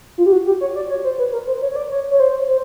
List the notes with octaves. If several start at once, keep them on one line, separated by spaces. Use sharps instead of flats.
F4
G4
F#4
G4
C#5
D5
C#5
C5
B4
A#4
C5
C#5
C#5
D5
C#5
C#5
C5
C5